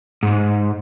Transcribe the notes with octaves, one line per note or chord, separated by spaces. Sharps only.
G#2